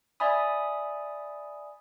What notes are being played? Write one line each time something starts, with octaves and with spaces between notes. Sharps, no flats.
D5 E5 G#5 B5 D#6